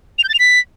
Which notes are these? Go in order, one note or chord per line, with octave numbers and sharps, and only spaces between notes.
F7
G6
A6
F7
B6